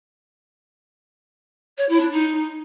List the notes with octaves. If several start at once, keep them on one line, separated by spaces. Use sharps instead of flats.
C#5
E4
D4
D#4